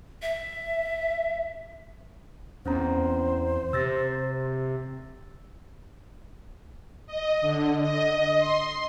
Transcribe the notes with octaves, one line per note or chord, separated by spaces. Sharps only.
E5
E2 C4 C#4 C5 A#5
C3 E6 A6 A#6
D#5
D3
D#5
C6